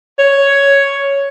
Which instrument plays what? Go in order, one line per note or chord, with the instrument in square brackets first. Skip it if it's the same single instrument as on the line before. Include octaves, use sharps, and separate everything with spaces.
[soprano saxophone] C#5